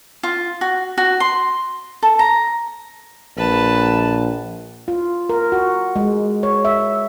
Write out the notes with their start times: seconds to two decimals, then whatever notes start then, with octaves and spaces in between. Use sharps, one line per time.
0.23 F4
0.61 F#4
0.98 F#4
1.20 C6
2.03 A4
2.19 A#5
3.37 A#1 B4 A5
4.88 F4
5.30 A#4
5.52 F#4
5.96 G#3
6.43 C#5
6.65 E5